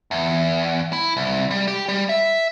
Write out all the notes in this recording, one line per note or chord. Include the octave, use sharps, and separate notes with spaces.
E2
E4
C2
G3
G4
G3
E5